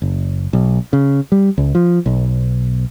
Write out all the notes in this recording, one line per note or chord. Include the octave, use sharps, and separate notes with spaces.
F#1
B1
C#3
G3
C#2
F3
B1